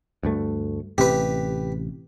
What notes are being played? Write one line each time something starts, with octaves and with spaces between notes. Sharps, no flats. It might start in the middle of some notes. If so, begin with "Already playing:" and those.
D2 G2 A3
A1 C3 G4 B4